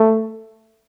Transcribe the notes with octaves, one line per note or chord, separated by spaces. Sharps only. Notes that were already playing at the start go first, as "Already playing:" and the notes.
Already playing: A3